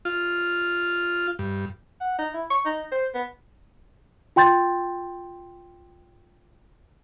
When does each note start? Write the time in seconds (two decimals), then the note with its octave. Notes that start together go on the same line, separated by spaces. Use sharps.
0.05 F4
1.39 G2
2.01 F#5
2.19 D#4
2.34 E4
2.50 C#6
2.66 D#4
2.92 C5
3.14 B3
4.36 F4 G5 C6 G6 A6